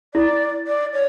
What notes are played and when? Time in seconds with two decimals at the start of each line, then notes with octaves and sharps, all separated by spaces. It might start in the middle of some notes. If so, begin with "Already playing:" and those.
0.14 E4 D5
0.67 D5
0.93 C#5